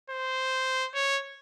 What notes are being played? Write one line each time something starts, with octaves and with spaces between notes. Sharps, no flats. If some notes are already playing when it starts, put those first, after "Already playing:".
C5
C#5